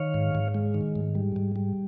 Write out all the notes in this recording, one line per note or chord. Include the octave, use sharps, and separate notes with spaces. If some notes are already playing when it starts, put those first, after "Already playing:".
Already playing: D#3 C#5 F5
G#2
G#2
G#3
D#3
G#2
G3
G#2
G3